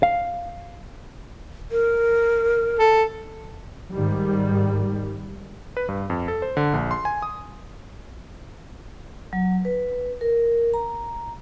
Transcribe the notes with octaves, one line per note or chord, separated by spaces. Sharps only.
F5
A#4
A4
G#2 D#3 G3
B4
G2
F2
A4
C5
D3
A#1
C6
G#5
D#6
F#3
B4
A#4
A#5